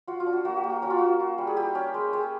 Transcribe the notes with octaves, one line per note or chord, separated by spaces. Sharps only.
F4 F#4
F4
D4
F#4
A#3 F#4
G4
A#3
F#4
C#4 F#4
F4
A#3 F#4
F4
G3
G#4
E4 G4
C#4
G#3
G#3